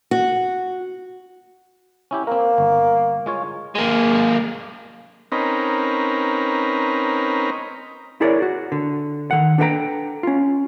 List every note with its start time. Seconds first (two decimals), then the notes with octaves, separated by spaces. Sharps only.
0.11 F#4
2.11 C#4 E4 G4
2.27 A#3 C4 A#4
2.58 G1
3.26 G#3 F4 C#5
3.75 G#3 A#3
5.32 C4 C#4 D#4 A#4 B4
8.21 E4 G#4 A#4 C#5 D5
8.42 F#4
8.72 D3
9.31 D#3 F#5
9.58 D4 A4 B4 D#5 G5 A#5
10.23 C#4 F4